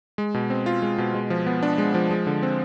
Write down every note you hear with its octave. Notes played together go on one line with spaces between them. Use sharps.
G#3
B2
C4
F4
G#3
B2
G#3
F3
B3
D4
G#3
F3
G#3
D3
C4